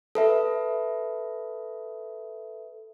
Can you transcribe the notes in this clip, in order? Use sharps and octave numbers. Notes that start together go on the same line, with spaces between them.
A4 B4 E5